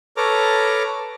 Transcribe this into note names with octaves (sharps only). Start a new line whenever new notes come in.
A4 B4 C#5 A#5 D6 F6